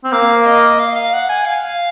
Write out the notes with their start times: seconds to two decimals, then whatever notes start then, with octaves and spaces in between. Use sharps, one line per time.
0.04 C4
0.12 A#3 F5
0.46 D#5
0.79 F5
0.96 F5
1.13 F#5
1.29 G#5
1.46 F5